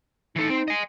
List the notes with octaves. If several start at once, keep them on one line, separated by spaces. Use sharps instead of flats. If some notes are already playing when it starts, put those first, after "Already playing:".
E3 D#4 A4
C4
D#5 G#5